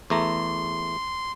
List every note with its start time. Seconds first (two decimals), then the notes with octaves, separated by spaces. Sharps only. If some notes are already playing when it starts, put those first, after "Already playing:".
0.10 E2 A3 A#5 C6